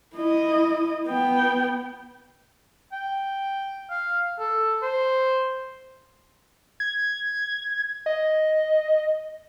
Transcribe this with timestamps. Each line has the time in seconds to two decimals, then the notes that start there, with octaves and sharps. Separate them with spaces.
0.15 E4 D#5
1.07 B3 G5
2.92 G5
3.90 F5
4.39 A4
4.82 C5
6.80 G#6
8.06 D#5